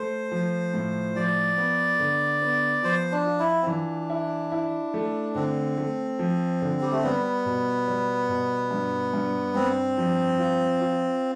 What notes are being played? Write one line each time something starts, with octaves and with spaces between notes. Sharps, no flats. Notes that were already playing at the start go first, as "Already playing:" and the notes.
Already playing: A3 C5
F3
A2
F3 D5
B3
D3
B3
F3 C5
D4
F4
E4
C4
E3 D4
E4
E4
A3
D3 C4
A3
F3
D3
G3
A3
G3 B3
B2
G3
B2
G2
G2
G2 C4
F3
F4
F4